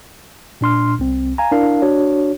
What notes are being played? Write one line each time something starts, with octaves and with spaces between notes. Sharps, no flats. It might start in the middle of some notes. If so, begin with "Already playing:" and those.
A#2 D4 C6 F6
C2 C4
F5 G#5 A#5
D4 E4 A#4 F5
D4 F#4 C#5